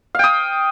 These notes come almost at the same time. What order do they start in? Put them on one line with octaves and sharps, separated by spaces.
F5 G5 D#6